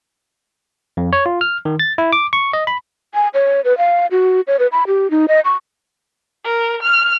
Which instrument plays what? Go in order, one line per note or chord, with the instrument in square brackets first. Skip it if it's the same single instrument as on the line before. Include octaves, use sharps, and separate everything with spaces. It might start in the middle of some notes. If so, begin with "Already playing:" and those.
[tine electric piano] F2
C#5
F4
F6
D#3
A6
E4
D6
C#6
D#5
B5
[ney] G#5
C#5
B4
F5
F#4
C#5
B4
B5
G4
D#4
D#5
C#6
[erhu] A#4
F6